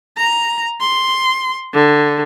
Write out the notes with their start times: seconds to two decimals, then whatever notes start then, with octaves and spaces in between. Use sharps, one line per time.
0.17 A#5
0.81 C6
1.73 D3